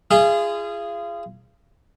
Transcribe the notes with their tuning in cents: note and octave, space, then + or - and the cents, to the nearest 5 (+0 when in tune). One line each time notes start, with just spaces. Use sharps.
F4 -35 G#4 -10 D#5 -15